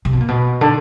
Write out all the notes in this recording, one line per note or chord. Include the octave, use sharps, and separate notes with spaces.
C3
B2
A#2
B2
D3